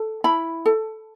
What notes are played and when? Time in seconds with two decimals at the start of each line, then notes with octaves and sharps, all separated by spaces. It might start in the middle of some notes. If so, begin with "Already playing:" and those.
Already playing: A4
0.24 E4 B5
0.66 A4